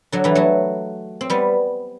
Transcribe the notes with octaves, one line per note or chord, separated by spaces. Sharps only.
D3 F#3
E3 G3
F#3 A3
C4
G3 B3